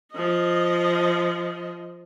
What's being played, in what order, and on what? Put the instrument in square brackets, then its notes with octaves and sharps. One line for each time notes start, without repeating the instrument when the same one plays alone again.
[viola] F3 D#5